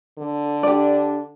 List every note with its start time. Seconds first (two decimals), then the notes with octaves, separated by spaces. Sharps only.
0.19 D3
0.63 D4 G4 D5